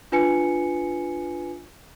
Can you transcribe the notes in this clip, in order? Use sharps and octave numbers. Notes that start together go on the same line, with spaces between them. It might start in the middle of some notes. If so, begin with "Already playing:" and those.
D4 F4 B4 G#5 C#7